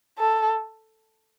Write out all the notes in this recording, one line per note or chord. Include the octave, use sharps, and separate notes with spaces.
A4